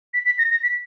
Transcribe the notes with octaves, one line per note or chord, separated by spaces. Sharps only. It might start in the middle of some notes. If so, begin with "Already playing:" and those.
B6
B6
A#6
A#6
B6